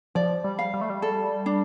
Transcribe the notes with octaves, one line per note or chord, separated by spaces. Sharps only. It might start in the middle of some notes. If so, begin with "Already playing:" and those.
F3 D5
G3
F5
G3
A3
G3
A4
D4